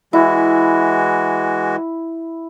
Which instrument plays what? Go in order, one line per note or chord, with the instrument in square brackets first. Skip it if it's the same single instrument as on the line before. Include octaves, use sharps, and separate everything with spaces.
[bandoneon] E3 G#3 F#4 [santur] E4